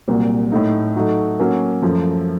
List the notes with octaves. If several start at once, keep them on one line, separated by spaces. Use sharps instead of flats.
C2 A#2 F#3
A2 A3 D#4
F#3 A3 D#4 F#4
F#3 A#3 C#4
F#2 F3 A3